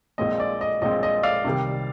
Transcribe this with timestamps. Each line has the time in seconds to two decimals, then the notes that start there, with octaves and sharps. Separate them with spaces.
0.18 A#1 A#2 G#3 C4 D#5
0.40 D5
0.61 D#5
0.82 A#1 A#2 G#3 C4 D#5
1.03 D#5
1.23 D5 F5
1.45 C2 C3 D#3 G3